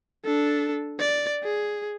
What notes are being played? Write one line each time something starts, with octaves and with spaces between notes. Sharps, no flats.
D4 A4
D5
G#4